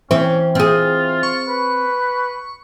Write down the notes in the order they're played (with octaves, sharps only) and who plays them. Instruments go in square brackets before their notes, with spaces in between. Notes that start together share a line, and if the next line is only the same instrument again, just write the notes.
[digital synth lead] E3 [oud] C4 [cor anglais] C#4
[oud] C4 G#4 [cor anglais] F4
[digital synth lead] C#6
[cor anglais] B4